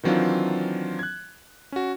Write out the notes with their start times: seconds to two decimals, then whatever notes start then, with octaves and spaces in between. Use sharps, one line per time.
0.03 D#3 E3 F#3 C4 D4 F4
0.99 F#6 G#6
1.72 C#4 F#4